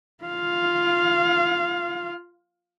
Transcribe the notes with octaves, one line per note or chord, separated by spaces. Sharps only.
F4 F5